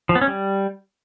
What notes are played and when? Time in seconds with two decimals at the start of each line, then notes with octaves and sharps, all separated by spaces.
0.09 F3
0.15 B3
0.21 C#4
0.28 G3